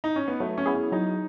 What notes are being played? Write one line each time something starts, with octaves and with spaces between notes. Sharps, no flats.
D#4
C#4
B3
F#3 A3
C#4
B3 E4 G#4
C#4
F#3 D#4